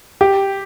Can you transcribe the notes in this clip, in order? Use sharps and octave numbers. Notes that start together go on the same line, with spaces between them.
G4